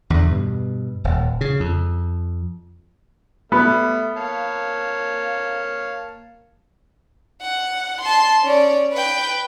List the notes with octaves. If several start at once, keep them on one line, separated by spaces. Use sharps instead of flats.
E2 D3
G2 B2
D#1
C#3
F2
G3 A3 B3 B5
A#3 C#5 F5 A5
F#5
A5 C6
C#4 D5
B4 G5